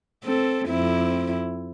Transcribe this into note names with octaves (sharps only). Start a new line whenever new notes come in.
C4 A4
F2 C4 E4